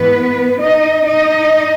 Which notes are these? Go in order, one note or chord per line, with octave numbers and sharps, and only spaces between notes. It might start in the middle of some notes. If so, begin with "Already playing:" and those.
Already playing: G#2 E3 B3 B4
D#4 D#5
D#4 D#5